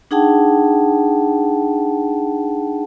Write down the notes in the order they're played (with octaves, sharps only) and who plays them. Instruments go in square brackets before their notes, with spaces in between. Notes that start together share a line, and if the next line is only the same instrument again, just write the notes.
[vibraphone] D4 D#4 G#4 F#5 G5 A5